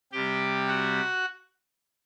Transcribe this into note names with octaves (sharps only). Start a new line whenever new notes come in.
C3 G3 G4 G5
F#4 F#5